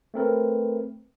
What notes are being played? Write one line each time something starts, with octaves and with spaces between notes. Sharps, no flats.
A3 C4 A#4 B4